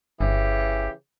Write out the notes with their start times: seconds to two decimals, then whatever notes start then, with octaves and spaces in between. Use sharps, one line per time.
0.21 G1 C#3 E3 G4